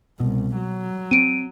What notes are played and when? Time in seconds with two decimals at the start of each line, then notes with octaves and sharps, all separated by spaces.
0.20 C2 B2
0.57 F#3
1.11 C4 D7 D#7